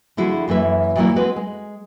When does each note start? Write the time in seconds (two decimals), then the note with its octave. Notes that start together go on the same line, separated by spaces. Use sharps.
0.17 D3 F3 E4 F#4 G#4
0.48 F#2 E3 A#3 B4 E5
0.96 A#2 E3 F#3 A3 A#3 E4
1.16 G#3 C4 F#4 B4 D#5
1.36 G#3